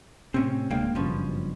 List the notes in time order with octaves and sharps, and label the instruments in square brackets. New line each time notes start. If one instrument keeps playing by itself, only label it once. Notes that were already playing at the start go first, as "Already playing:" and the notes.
[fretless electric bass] A2 C3 [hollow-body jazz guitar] C4 C#4
[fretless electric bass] D1 G#3 D4 [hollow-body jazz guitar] A#3 F5 G5
[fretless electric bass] F#1 G2 [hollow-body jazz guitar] B2 F3 C#4